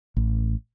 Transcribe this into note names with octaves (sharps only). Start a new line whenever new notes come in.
A1